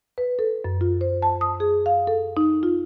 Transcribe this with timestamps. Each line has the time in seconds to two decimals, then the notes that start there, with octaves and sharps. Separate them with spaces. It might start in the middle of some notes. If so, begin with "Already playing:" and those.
0.18 B4
0.39 A4
0.64 F#2
0.81 F4
1.01 C5
1.22 A5
1.41 D#6
1.60 G#4
1.86 F5
2.07 A4
2.37 D#4
2.63 F4